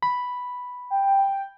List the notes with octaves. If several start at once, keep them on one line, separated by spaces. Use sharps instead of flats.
B5
G5